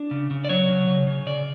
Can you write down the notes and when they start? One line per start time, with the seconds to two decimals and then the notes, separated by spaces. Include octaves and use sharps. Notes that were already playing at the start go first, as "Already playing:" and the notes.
Already playing: D4
0.11 C#3
0.31 C#3
0.45 D5
0.49 F#3 C#5
0.69 C#3
0.87 C#3
1.07 C#3
1.26 C#3 D5